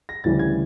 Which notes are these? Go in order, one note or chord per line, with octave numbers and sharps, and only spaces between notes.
A#6
D2 C#3 E3 G3 A6
G#6